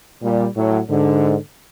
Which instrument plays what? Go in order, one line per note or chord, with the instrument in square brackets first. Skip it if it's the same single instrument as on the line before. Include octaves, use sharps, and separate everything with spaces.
[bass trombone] A#2 [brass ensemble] G3
[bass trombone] A2 [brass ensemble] F#3
[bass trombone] G#2 [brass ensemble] D3